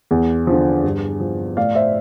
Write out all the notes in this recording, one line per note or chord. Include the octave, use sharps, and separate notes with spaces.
E2
D3 F3
G2
F3
A2 D5 F5
C5 E5